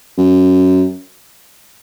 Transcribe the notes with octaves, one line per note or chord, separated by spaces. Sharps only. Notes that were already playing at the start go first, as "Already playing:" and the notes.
F#2